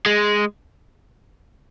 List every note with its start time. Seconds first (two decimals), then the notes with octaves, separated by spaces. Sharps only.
0.06 G#3